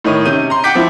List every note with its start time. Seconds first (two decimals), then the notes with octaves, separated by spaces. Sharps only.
0.04 A2 D#3 D#4 C#5 D#7
0.25 C3 C#4 G6 D#7
0.50 A#5 C6
0.64 F#5 G5 D6 G6 B6 D7
0.75 F3 C4 E4